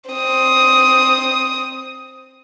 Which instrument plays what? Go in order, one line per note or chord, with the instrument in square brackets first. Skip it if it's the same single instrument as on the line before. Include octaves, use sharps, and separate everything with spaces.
[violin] C4 D#6